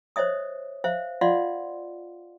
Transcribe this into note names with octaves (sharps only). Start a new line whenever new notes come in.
C5 C#5 D#5 E5 D#6
C5 E5 F5
F4 D5 D#5 F5 F#5 C6